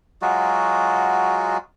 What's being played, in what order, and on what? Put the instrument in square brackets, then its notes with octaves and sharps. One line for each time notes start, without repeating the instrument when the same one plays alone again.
[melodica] F#3 G#3 F4 F#4